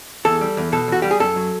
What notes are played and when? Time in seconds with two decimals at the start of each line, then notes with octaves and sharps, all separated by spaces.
0.25 E2 A4
0.41 G3
0.57 E2
0.72 B2 A4
0.88 E2 F#4
1.02 G3 G4
1.11 G#4
1.20 F#2 A4
1.36 F#3